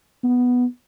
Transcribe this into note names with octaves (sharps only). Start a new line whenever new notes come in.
B3